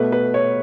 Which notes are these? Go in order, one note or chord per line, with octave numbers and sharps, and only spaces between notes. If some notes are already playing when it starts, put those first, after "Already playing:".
Already playing: B2 A3 B4
B4
C#5